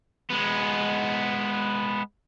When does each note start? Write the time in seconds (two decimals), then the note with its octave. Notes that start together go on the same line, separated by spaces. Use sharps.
0.30 G#3 B3